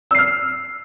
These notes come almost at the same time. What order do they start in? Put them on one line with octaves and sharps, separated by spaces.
E6 C7 F6